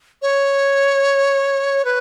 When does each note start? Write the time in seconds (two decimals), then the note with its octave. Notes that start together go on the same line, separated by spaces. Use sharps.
0.22 C#5
1.85 B4